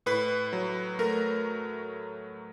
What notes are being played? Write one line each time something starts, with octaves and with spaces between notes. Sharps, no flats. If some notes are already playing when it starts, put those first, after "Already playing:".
A2 B4
F#3
A3 A#4